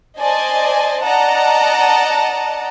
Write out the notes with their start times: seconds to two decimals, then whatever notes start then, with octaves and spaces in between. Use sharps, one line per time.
0.18 C5 D5 D#5 G#5 A5
1.03 D5 D#5 F#5 A5 A#5